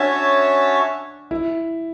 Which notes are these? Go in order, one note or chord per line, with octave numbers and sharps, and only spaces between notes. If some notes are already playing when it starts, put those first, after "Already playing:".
Already playing: C#4 D4 F#4 C#5 E5 A5
E4